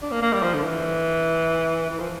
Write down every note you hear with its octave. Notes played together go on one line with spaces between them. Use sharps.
D4
A#3
A#3
G3
F3
D3
E3
E3
F3